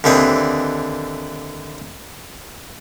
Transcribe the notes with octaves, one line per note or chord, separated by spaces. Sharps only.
D#2 D3 E3 C4 D#6